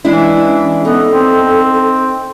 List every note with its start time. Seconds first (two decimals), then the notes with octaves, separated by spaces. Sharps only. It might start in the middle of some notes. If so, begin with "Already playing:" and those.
0.05 E3 G#3 C#4 D4 E4
0.85 B3 D#4 A4
1.10 C4